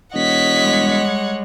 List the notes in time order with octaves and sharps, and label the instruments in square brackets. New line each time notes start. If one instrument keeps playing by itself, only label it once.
[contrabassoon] E1 [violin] C#5 F#5 [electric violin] D#5 B6
[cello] G3 G#3